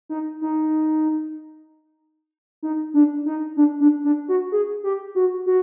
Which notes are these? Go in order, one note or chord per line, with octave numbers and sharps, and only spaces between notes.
D#4
D#4
D#4
D4
D#4
D4
D4
D4
F#4
G#4
G4
F#4
F#4